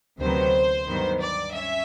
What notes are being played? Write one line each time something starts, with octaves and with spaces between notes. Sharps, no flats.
D2 C3 D#3 F#3 B3 C5
G2 D#3 F#3 B3
D5
C#4 E5